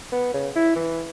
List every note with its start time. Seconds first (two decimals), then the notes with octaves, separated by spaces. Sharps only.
0.12 B3
0.34 C#3
0.56 E4
0.76 E3